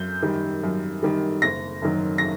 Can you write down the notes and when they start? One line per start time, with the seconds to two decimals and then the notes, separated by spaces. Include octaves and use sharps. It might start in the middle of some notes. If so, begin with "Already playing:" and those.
Already playing: F#2 G6
0.23 D#3 G3
0.63 F#2
1.03 D#3 G3
1.42 F#1 A#6
1.82 F#2 D#3 F#3
2.18 A#6